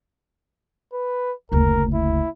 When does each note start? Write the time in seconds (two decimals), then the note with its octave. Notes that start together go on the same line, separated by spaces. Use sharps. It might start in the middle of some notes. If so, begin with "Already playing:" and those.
0.93 B4
1.52 F#1 D2 A#4
1.94 E4